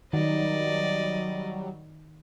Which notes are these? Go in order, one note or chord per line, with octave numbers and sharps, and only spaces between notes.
D#3 F#3 G3 D5 D#5